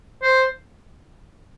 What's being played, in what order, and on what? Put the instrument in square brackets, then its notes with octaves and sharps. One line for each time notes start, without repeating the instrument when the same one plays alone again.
[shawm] C5